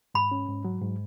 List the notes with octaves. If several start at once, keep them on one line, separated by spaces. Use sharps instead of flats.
G#2 B5
C#4
G#2
F#3
G#2